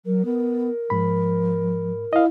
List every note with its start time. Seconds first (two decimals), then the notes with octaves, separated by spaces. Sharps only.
0.06 F#3 A#4
0.25 B3 A#4
0.90 G#2 F3 B5
2.13 E4 D#5 F5